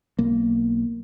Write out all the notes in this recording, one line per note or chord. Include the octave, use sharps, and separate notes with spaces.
B1 A#3